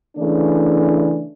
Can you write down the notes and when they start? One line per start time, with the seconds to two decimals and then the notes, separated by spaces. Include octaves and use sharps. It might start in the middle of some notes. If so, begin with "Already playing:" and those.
0.16 C#3 E3 A3 D4